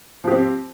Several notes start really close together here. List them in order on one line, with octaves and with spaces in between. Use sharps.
F3 G4 C4